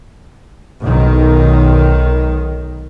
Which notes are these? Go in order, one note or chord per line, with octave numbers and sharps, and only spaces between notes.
B1 D#3